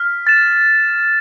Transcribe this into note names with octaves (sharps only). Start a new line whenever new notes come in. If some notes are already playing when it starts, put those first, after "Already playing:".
Already playing: F6 B6
A6 E7